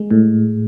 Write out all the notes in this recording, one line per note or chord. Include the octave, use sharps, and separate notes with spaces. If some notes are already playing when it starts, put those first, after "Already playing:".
Already playing: G#3
A2